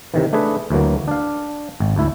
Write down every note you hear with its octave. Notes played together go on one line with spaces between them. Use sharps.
C3 D#3 E3
A3 D4 G#4 B4
D2 E3 F#3 A#3
D4 F5
G#1
D2 E4